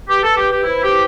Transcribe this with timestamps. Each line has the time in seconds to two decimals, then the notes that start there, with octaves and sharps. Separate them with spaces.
0.09 G4 B4
0.23 A4
0.36 G4 B4
0.51 G4
0.64 E4 C5
0.83 G4
0.92 E4